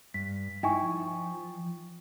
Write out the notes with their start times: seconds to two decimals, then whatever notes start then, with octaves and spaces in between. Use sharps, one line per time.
0.14 G2 B6
0.63 D#4 E4 G5 G#5 C#6
0.83 F3